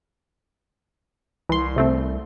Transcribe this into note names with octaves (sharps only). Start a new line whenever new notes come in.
C2 E3 C6
C3 A3 C4